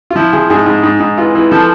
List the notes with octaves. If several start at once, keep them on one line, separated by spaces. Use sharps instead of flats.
F4
F3 E4
F3 G#4
G#2 G#4
G#2
G#2
G#2
E3 F4
E3
F3 A4